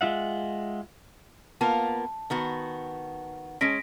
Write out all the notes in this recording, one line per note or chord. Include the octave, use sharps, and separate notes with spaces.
G#3 F4 E5 F#5
A#3 B3 F4 A5
D#3 B3 F#4
G#3 C#4 A#6 B6 D7